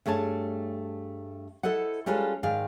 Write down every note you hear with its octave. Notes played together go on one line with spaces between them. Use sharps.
G2 A3 G#4 C#5 A5
E4 A4 C5 D#5 F#5
G3 G#3 C#4 F4 A4 B4
G#2 D#3 G#4 D5 F5